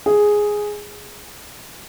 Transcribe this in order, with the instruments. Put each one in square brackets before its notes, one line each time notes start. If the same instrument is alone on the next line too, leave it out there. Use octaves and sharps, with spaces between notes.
[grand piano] G#4